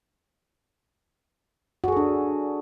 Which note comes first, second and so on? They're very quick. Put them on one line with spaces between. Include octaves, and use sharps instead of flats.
F#4 G#4 A4 D4